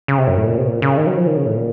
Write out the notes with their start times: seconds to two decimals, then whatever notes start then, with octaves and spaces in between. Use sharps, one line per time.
0.08 C#3
0.18 C3
0.28 F#2
0.37 A2
0.47 A#2
0.58 C3
0.67 A#2
0.82 C#3
0.97 D#3
1.07 F#3
1.17 F3
1.27 D#3
1.37 C#3
1.46 A2
1.56 A#2